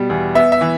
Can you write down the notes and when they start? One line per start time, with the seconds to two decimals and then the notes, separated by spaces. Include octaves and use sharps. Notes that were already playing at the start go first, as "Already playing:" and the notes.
Already playing: B2 G3
0.10 E2
0.35 B3 E5
0.52 E5
0.61 E3